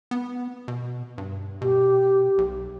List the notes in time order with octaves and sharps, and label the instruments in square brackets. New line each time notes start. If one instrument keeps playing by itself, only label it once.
[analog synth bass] B3
B2
G2
[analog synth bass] B2 [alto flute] G4
[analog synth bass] B1